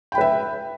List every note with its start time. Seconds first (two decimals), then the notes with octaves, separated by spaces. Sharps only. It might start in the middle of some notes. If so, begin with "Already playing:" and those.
0.12 G5
0.15 B5
0.18 B4
0.21 E5